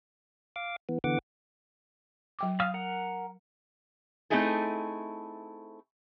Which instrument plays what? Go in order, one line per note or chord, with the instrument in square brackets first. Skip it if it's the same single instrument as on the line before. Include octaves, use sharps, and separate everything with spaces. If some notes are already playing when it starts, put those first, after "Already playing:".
[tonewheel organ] F5 D6
E3 B3
D3 E3 B3 F#5 D6
[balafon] F#3 G5 D6
[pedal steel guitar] F5 D#6 F6
A#4 F#5
[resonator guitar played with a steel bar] A3 C4 D#4 E4 G#4 A4